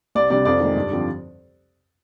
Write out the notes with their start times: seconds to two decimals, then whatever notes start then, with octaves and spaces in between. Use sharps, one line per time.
0.15 C2 D5
0.30 C3 G3 D4 D5
0.45 F2 D5
0.60 D#3 G#3
0.76 G2
0.91 D3 F3 C4